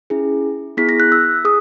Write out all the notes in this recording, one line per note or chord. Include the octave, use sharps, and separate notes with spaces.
C#4 E4 G#4
B3 E4 G#4 B6
A#6
F#6
E6
G#4 D#6